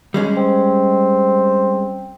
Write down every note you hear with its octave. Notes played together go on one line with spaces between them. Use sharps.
G3 G#3 C#4
C4